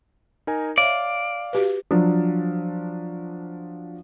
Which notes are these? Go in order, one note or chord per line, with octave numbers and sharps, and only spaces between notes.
D#4 A#4 G#5
C#5 D5 E5 F5
F#4 G4 B4
F3 F#3 D4